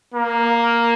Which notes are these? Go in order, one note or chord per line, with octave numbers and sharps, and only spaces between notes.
A#3